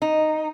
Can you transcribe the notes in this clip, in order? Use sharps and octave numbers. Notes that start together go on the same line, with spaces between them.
D#4